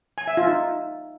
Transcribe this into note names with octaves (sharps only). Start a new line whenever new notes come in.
G#5
E5
F4
D#4